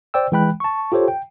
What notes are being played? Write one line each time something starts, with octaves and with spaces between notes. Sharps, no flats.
C5 D5 G5 E6
E3 G#3 G5 B5 F#6
A5 C#6
F4 G4 A4 C5 C#5
G5